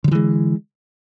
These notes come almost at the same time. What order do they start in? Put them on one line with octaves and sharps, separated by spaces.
D3 F#3 E3 G#3